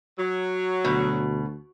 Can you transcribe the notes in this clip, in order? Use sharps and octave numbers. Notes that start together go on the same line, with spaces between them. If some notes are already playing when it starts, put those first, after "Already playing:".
F#3
D2 B2